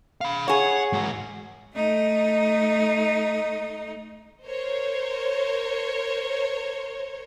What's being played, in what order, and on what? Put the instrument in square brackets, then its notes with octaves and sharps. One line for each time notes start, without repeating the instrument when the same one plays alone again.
[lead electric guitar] F5 B5
[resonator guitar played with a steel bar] G#4 C#5 [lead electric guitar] F#5
[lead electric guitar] G#2 F#4
[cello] A3 D#4
[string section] A#4 C5 C#5